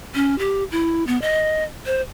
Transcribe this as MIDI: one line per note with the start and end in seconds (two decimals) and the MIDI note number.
0.15 0.38 61
0.39 0.64 67
0.71 1.06 64
1.07 1.20 59
1.22 1.64 75
1.86 2.01 72